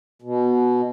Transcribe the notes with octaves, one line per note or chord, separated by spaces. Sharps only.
B2